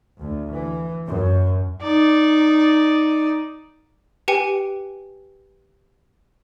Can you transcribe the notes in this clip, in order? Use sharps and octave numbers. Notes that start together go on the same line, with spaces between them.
D2
E3
F#2
D#4 D5
G4 B4 G5 G#5 C#7